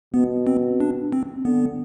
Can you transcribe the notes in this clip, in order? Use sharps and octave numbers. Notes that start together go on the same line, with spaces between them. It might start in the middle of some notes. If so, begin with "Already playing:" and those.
B2 B3
C4
D4
C4
D3 B3